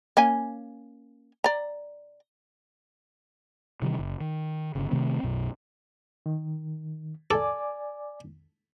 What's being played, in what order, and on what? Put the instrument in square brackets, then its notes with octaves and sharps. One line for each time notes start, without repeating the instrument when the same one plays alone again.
[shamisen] A#3 C#4 G#5
D5 A#5
[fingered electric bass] C3 D#3 E3 G3
F#1
D#3
G1 C#3
C3 D#3 A3 C4
B1 F#2 B2
[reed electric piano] D#3
[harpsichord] A4 [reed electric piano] D5 G#5 D6